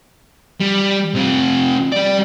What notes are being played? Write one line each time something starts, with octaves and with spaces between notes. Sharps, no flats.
G3
C3 F4
G3 D5